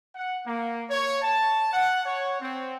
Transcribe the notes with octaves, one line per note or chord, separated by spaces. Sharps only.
F#5
A#3
C#5
A5
F#5
C#5
C4